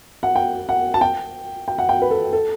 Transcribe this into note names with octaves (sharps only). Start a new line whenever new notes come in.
F#5
G5
F#5
A5
G5
G5
F#5
G5
B4
A4
A4